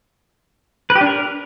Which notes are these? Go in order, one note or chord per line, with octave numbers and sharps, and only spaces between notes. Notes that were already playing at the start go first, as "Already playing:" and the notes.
B4
G4
D4
A#4